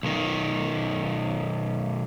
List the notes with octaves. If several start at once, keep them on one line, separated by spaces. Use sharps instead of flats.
B1 D#3